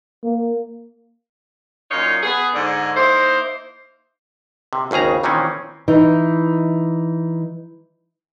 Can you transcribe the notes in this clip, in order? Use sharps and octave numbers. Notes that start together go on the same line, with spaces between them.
A#3
F#2 A#2 D#4 C#5 F5
B3 G#4
G#2 D3
A#3 D#4 E4 C5
C3
G#1 D#2 C#3 G#4 A#5
A#2 D#3 E3 C4 C#4
E3 D#4